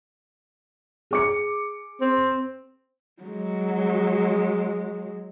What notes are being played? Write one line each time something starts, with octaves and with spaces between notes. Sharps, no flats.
G#4 D6 C#7
C4
F#3 G#3